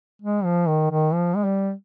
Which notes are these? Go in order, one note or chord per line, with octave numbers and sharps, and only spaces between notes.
G#3
F3
D#3
D#3
F3
G#3
G3